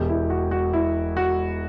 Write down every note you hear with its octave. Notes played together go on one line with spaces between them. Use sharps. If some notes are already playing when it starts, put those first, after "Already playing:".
Already playing: E1 E2 B2 G4
E4
F#4
F#4
E4
F#4